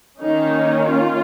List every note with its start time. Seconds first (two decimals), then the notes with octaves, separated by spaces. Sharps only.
0.21 D#3 A#3 C#4 D#4
0.90 F4